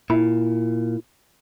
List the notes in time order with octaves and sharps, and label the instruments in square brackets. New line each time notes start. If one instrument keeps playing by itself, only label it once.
[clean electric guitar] A#2 [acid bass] E4